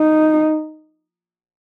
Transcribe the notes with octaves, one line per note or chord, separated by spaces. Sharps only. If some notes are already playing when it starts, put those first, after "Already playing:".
Already playing: D#4